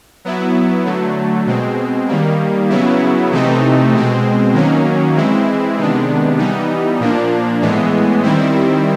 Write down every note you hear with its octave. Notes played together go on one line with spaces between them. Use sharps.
F#3 B3 E4
D3 F#3 A3
B2 G#3 C4
D#3 G3 A#3
C#3 F#3 B3 E4
C3 E3 A3 C4 D#4
B2 G#3 C4
D#3 F#3 A#3 C#4
E3 G#3 C4 E4
C3 D#3 G#3 B3 D4
E3 G3 B3 D#4
A#2 F3 A#3 D4
A2 E3 G#3 B3
D#3 G3 C4 E4